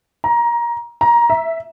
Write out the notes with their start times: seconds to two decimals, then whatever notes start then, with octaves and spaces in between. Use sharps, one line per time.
0.24 A#5
1.01 A#5
1.30 E5